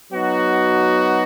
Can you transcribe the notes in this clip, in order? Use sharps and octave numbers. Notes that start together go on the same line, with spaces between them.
F#3 B3 D#4 F#4